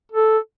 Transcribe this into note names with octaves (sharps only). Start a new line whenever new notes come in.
A4